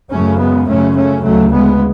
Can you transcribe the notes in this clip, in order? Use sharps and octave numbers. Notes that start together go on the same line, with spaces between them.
F#2 C#3 A3 C#4
G#3 B3
F#2 C#3 A3 C#4
A3 C#4
D2 C#3 F#3 A3
G#3 B3